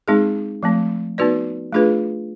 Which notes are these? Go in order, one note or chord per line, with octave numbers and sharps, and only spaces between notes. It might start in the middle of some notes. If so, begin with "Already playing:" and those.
G#3 C4 D#4 G#4
F3 A3 C4
B3 D#4 F#4 B4 D5
A3 D4 F4 G#4 B4